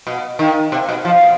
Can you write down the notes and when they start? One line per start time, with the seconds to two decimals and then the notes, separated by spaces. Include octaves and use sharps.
0.07 B2
0.39 D#3
0.72 C3
0.89 B2
1.05 F3
1.21 B2